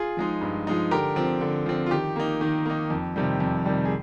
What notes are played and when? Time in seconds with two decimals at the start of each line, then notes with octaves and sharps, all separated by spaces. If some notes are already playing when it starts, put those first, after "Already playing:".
Already playing: F4 G#4
0.17 F3 G#3 D#4
0.41 G2
0.67 F3 G#3 D#4
0.91 D3 G4 A#4
1.16 F3 C4
1.41 D3
1.66 F3 C4
1.86 F4
1.91 D#3 G4
2.16 A#3 D#4
2.41 D#3
2.65 A#3 D#4
2.90 F2
3.16 C3 D#3 G3
3.40 F2
3.65 C3 D#3 G3
3.85 G#4